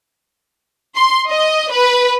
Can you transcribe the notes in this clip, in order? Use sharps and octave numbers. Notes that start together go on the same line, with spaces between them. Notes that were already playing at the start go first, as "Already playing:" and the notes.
C6
D#5
B4